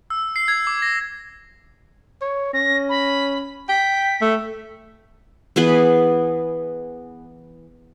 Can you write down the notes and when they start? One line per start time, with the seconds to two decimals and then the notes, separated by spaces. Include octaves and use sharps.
0.10 E6
0.36 C7
0.48 G#6
0.67 D6
0.82 A#6
2.22 C#5
2.53 C#4 A#6
2.89 B5
3.69 G5 B6
4.21 A3
5.56 E3 B3 G#4 B4